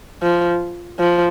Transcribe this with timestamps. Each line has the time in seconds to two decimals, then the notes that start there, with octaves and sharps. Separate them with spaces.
0.22 F3
0.99 F3